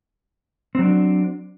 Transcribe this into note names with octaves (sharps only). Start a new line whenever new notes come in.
F#3 C4 D4